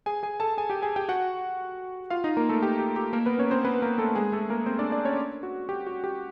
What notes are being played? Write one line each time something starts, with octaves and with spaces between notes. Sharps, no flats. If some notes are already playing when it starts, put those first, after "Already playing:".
G#4 G#5
G#4 G#5
A4 A5
G#4 G#5
G4 G5
G#4 G#5
G4 G5
F#4 F#5
F4 F5
D#4 D#5
A#3 A#4
A3 A4
G4
G4
G4
A#3 A#4
B3 B4
C#4 C#5
C4 C5
B3 B4
A#3 A#4
A3 A4
G#3 G#4
A3 A4
A#3 A#4
C4 C5
D4 D5
D4 D5
C#4 C#5
F#4
G4
F#4
G4